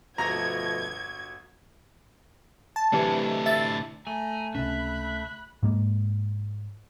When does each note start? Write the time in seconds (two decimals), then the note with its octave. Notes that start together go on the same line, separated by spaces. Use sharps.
0.18 G1 B2 F3 A3 F#4 A#5 G#6 A#6
2.76 A5
2.92 D2 A2 C3 E3
3.46 E5 A6
4.07 A3 G#5 A#5
4.55 C#2 C3 C#4 E5 B5 F#6
5.63 G#2 G#3 A#3